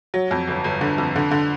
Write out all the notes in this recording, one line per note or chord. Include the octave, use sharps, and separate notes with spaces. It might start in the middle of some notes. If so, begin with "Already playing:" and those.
F#3
F2
G1
G1
D3
F2
D3
D3